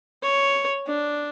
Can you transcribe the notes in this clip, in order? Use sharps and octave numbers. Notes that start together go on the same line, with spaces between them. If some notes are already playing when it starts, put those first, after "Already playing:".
C#5
D4